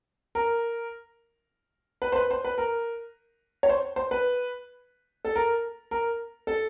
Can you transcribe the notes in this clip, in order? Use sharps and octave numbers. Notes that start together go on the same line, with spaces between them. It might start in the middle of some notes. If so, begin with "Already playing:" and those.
A#4
B4
C5
B4
C5
B4
A#4
C#5
C5
C5
B4
A4
A#4
A#4
A4